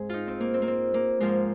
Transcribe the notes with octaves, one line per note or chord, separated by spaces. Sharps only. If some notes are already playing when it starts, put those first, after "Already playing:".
Already playing: G#2 G#3 C4 G#4
D#4 F4
C4
A#3
C4
A#3
C4
A#3
G#2 F3 G#3 A#3